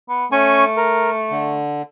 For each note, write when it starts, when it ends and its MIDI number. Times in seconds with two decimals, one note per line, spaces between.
0.09 0.26 59
0.32 1.61 57
0.32 0.64 61
0.32 0.64 80
0.32 0.64 85
0.77 1.10 70
1.31 1.82 50